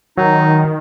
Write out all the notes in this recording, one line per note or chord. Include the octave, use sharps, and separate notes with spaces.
D#3 F#3 D#4